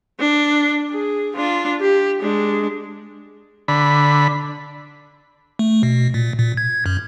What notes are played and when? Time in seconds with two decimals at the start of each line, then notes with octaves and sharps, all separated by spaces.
0.20 D4
0.91 G#4
1.36 D4 F4
1.81 G4
2.21 G#3 D4
3.68 D3 B5
5.59 A3
5.83 B2
6.14 A#2
6.39 A#2
6.57 G#6
6.86 F#2